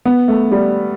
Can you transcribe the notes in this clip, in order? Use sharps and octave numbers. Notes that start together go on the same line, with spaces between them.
B3
A3
G3